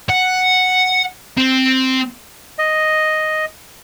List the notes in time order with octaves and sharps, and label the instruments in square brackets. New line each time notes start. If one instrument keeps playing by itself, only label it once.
[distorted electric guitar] F#5
C4
[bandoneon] D#5